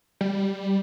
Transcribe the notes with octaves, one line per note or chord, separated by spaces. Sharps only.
G3